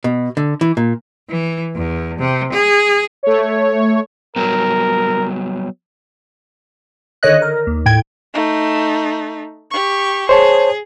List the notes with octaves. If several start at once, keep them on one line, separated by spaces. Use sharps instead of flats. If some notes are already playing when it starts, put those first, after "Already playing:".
B2
D3
E3
A#2
E3
E2
C3
G#4
A3 C#5
F#3 G3 B3 A#4
D3 D#3 C#5 D#5 F#6
A#4
D#2
A2 G5 G#6
A3 D#4
G4 C#6
G#4 C5 C#5 A5